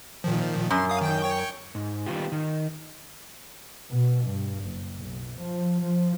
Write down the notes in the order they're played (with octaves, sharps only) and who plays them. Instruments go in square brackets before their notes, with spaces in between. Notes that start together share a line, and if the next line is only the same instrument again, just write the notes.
[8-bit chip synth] A#2 D#3 F3
[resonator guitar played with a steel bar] F#2 [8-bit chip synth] C6
[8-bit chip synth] F5 D#6
D#3 G5 G6
C#5 G5 C#6
[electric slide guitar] G#2
D#3 G3 B3 F4 G4
D#3
[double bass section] B2
G2
F#1
B1
F3
F3